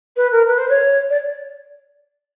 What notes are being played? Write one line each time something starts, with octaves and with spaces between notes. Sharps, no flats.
B4
A#4
B4
C5
C#5
D5